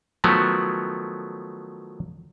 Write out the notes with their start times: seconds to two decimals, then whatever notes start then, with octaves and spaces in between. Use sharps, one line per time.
0.24 D#3 F3 F#3 A3 B3